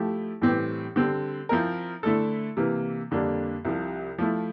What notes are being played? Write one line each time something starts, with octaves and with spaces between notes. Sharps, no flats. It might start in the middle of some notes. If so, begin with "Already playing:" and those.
Already playing: F3 A3 E4 G4
A2 E3 G3 C4 G4
D3 G3 C4
F3 C4 E4 A#4
D3 A3 E4 A4
C3 E3 A#3
F2 D3 G3 A#3 D4
C2 C3 F3
F3 A3 E4